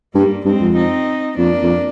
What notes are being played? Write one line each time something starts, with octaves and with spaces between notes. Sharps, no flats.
G2 G3 A#3
G2 G#3 C4
F2
C4 D#4
F2 A#3 D4
F2